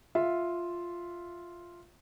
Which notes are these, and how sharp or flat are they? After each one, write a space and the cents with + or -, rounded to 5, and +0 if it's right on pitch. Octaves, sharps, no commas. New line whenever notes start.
F4 +0 E5 +0